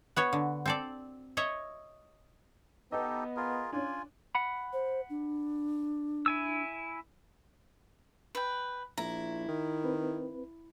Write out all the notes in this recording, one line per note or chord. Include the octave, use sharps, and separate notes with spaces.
B3 F#4 C#5
D3
C4 A4 D5
C#5 D#5 E5
B3 D#4 G4 A4 D#5
F4 G#4 A#4
C#4 D4 F4 G#5
F#5 B5
C5
D4
E4 G#5 E6
B4 G5
A#1 E4 A#5
D#3
C4 B4